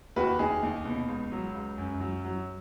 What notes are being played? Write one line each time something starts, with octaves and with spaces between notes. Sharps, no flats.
D#2 F#4 B4
D#2 D#4 G#4
D#2 D#4
B2
C#2
F#3
C#2
F#2
F#3
F#3